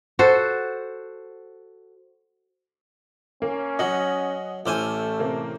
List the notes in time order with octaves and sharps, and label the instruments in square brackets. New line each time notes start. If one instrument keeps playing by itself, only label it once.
[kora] F#4 A4 C5
[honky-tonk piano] A#3 [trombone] C#4
[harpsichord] F#3 [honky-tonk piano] D#5 F#5
[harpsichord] A1 C5 G#5 [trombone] A3 [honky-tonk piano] D6 E6 F6
[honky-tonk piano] C3 A#3 C4